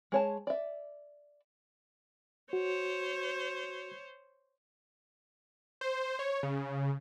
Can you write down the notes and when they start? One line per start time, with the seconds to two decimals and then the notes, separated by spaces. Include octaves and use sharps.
0.12 G#3 C#5 A5
0.47 D5 E5
2.53 F#4 C5 C#5
5.81 C5
6.19 C#5
6.43 C#3